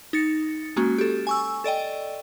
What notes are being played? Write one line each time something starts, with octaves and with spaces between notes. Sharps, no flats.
D#4 A6 C#7
G#3 A#3 C#4 F#4
G4 A4
G#5 C#6 E6
A4 D5 D#5 G5